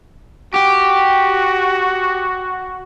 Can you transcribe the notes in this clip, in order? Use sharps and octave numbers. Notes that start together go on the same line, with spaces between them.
F#4 G4